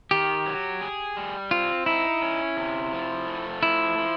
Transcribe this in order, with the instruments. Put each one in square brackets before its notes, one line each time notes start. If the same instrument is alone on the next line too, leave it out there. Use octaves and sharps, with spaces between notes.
[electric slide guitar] D#3 [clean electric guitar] G4
[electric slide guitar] F#3
G#4
G3
[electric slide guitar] C4 [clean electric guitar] F4
[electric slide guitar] D#4 [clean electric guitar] E4
[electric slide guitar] C#4
C3
F3
A3
[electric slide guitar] F3 [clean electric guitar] E4
[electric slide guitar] F3